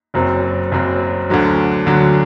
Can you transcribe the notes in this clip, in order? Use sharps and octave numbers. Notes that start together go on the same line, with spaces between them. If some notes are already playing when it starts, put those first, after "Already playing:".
F#1 F#2 F#3 C4
F#1 F#2 F#3 C4
D2 D3 F#3
D2 D3 F#3